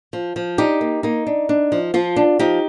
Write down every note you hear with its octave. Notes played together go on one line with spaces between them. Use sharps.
F3
F3
D4 D#4 G4
A#3
A#3 D#4
D4
D4
F3
F3 F4
D4
F3 D#4 G4